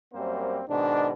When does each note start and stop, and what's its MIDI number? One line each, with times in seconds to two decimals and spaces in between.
0.14 0.61 42
0.14 0.61 55
0.14 0.61 58
0.14 0.61 60
0.14 0.61 72
0.68 1.11 44
0.68 1.11 47
0.68 1.11 51
0.68 1.11 62